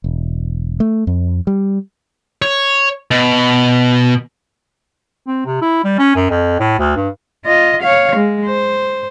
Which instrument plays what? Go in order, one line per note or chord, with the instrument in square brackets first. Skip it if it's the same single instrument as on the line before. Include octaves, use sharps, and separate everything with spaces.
[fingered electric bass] E1
A3
F2
G3
[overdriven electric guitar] C#5
B2
[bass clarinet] C4
C3
E4
G3
C#4
F#2
F2
A2
D2
G2
[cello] F4 D#5
C#5 F5
G#3
C5